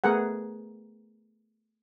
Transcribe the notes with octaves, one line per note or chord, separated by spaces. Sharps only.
A3 B3 G#4 A#4 F#5